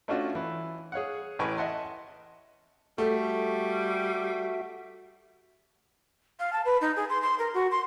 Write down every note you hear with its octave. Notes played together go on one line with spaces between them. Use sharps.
A3 C#4 D4 F4 F#4
E3
G#4 C#5 F5 F#5
A1 A2 B4 G#5 C#6
D#5 E5 F#5 A5 C6
G3 A3 F#4 E5
F5
A5
B4
D#4
G#4
C6
C6
A#4
F#4
C6